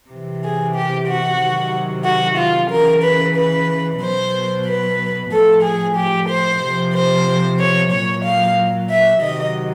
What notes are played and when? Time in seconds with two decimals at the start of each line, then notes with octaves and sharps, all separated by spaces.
0.10 C3 E3
0.43 G#4
0.75 G4
1.08 F#4
1.40 C3 D#3 F#3
2.05 F#4
2.38 F4
2.70 C#3 E3 A#4
3.04 B4
3.36 B4
4.01 B2 F#3 C5
4.66 B4
5.32 A2 F3 A4
5.63 G#4
5.96 G4
6.29 C5
6.61 C3 F3
6.93 C5
7.59 C#5
7.91 A#2 F#3 C#5
8.24 F5
8.90 E5
9.22 C3 D#3 F#3 D#5